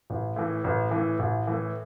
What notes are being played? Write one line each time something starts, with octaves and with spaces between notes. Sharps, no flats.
A1
A2 E3
A1
A2 E3
A1
A2 E3